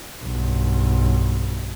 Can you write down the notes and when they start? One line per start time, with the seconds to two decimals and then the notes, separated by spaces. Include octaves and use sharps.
0.23 B1 G2